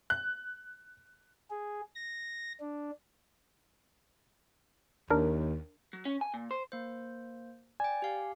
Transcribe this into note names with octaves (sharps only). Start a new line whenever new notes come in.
F#6
G#4
A#6
D4
D#2 D4 A#4
F#3
C#4
G#5
A#2
C5
A#3 C5
D5 G5 G#5
G4 F5